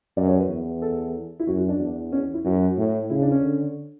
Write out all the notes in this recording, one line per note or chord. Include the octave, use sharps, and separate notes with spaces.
F#2 D5
C#5
B4
E2
A4
E4
F#2 F#4
F#4
D4
E2
C#4
E4
F#2 F#4
A2
C#3 E4
D4
C#4
D3